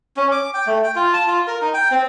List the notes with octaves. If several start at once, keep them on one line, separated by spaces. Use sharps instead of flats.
C#4
D6
G5
A3
G5
F4
A5
F4
A#4
D#4
G5
C4